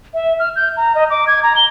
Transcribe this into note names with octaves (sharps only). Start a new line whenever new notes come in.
E5
F6
G6
A#5
D#5
D6
G#6
A#5
G7